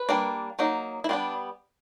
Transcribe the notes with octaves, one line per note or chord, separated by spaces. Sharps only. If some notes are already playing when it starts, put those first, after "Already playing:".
Already playing: B4
G3 A#3 D4
F#3 A#3 D#4
E4
G3 B3 D4 F4